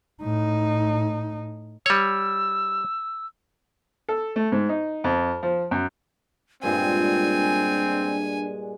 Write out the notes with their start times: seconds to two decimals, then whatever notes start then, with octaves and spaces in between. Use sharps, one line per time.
0.22 A2 D#4
1.86 G3 C#5 E6
4.08 A4
4.36 A3
4.52 G#2
4.69 D#4
5.04 F2
5.43 F3
5.71 F#2
6.63 G2 A#2 G#3 C4 D4 G#5